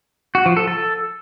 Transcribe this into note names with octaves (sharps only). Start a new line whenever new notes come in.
F#4
F3
A4
A4